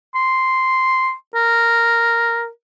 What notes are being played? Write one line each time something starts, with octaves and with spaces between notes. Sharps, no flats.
C6
A#4